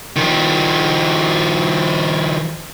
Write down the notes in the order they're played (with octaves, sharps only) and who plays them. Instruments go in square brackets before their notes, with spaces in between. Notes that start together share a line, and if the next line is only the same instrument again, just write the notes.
[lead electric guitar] D#3 F3